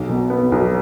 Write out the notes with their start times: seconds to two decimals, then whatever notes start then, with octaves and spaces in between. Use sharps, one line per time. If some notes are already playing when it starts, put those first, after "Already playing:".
Already playing: B1
0.09 B2
0.30 B3
0.52 B1